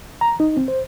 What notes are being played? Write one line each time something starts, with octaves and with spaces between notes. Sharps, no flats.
A#5
D#4
C4
C5